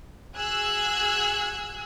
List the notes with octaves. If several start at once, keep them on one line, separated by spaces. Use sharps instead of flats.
F#4 G#4 E6 F#6 G#6